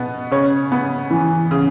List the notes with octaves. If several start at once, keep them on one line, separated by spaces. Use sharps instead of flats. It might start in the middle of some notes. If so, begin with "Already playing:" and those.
Already playing: B2 B3
C#3 C#5
B3
E3
C#3